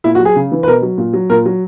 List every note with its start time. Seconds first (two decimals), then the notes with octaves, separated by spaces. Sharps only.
0.04 A#2 E4
0.15 F#4
0.20 F#3
0.25 G#4
0.36 C#3
0.52 E3
0.63 B4
0.67 B2 A#4
0.82 F#3
0.98 A#2
1.13 F#3
1.30 A#2 A#4
1.45 F#3